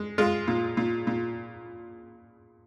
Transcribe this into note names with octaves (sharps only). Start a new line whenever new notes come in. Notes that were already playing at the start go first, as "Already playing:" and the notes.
Already playing: G#3
G#3 F4
A#2
A#2
A#2